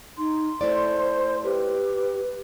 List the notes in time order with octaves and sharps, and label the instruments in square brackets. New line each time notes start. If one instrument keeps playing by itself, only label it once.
[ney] D#4 [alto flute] C6
[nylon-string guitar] A3 E4 D5 [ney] C5
[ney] G4 [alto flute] B4